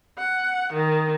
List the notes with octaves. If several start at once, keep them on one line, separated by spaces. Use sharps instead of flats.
F#5
D#3